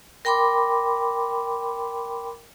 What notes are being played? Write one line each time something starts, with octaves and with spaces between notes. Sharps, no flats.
A#4 G5 B5 C6 D6